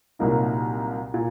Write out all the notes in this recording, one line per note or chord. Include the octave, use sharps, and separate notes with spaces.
C2 A#2 F#3 A#3 D#4
A#2